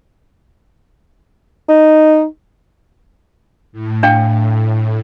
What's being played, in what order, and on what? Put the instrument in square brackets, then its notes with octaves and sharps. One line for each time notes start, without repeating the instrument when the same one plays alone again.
[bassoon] D#4
[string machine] A2
[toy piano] D4 F5 G5